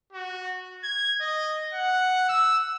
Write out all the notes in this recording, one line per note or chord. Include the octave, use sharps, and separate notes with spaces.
F#4
G#6
D#5
F#5
E6